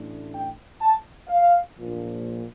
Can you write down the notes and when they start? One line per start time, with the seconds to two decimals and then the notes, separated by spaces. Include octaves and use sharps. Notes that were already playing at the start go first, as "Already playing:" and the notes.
Already playing: A1 A2 A3 D4
0.33 G5
0.81 A5
1.29 F5
1.77 A#1 A#2 F3